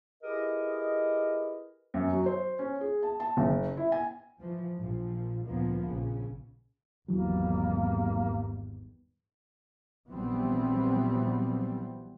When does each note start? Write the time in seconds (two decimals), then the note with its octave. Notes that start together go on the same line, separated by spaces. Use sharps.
0.23 E4 G4 G#4 A#4 B4 D#5
1.94 F#2
2.12 F#3
2.26 C5
2.59 C#4
2.81 G#4
3.03 A5
3.20 A5
3.37 F#1
3.77 E4
3.92 G#5
4.39 E3 F3
4.77 A#1 A#2 F3
5.45 D2 A#2 F3 A#3 B3
5.85 A#1 C#3
7.08 G#1 E2 E3 F#3 G3 A#3
10.11 A#1 E3 F#3 G3 B3 C4